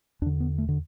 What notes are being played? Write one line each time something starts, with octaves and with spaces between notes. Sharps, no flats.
E2 D3 D4
B3
A3
D3